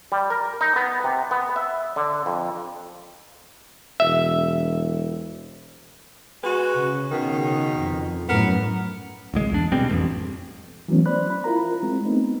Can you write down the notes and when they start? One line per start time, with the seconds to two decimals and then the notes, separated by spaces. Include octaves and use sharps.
0.12 G3
0.30 A#4
0.61 D#4
0.76 B3
1.04 C3
1.31 B3
1.56 E5
1.96 D3
2.26 F2
4.00 E1 E5
6.43 G#3 F#4 B4
6.72 C#3
7.11 B2 D#3
7.79 F2
8.28 F#2 A2 F#3 B3 A#4 B4
9.34 D1 C2 G#3
9.51 E2 D4
9.72 B2 G3 G#3 C4
9.90 A1 F2
10.88 E3 F#3 A3 B3 C#4
11.06 C5 D5 B5 F#6
11.30 B5
11.44 E4 F4 A#4 A#5
11.83 G#3 C4
12.05 G#3 A3 B3 C4 D#4